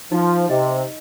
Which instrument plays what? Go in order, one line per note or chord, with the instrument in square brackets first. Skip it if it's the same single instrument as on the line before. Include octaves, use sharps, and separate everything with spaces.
[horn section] F3 [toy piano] D#4
[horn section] C3 [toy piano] D#5